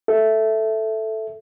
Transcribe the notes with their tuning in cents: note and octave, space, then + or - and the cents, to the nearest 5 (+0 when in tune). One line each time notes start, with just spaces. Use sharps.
A4 +0 E5 +0